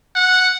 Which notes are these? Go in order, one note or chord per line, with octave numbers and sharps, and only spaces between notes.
F#5